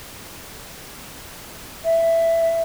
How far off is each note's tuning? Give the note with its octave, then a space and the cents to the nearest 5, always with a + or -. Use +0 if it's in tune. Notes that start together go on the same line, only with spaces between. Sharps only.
E5 +10